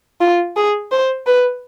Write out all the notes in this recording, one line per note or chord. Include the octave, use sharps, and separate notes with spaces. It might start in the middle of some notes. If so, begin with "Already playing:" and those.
F4
G#4
C5
B4